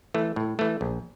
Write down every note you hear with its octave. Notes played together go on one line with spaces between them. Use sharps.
E3 A3
A2
E3 A3
A#1